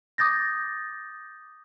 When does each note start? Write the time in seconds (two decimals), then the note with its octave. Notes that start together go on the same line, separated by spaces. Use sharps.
0.18 D6 D#6 G6 A6 A#6